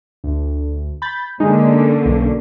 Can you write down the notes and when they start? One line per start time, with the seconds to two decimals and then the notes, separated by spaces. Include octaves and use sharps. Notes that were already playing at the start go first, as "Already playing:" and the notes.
0.24 D2
1.02 B5 G6 A6
1.40 D3 G#3 A#3 C#4 D#4
2.06 B1